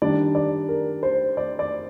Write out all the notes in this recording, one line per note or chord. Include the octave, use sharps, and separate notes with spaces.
D#3 G3 D4 D5
D5
A#4
C5
D5
D5